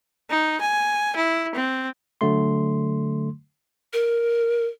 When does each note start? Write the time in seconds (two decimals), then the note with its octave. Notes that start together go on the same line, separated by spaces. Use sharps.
0.30 D#4
0.61 G#5
1.16 E4
1.55 C4
2.21 D3 F#3 A3 C6
3.93 A#4